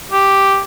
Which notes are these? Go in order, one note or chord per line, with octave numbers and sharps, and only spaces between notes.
G4